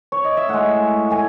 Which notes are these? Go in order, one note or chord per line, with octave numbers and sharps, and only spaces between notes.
C#5
D#5
E5
A2 G#3 F#5
A2 G#5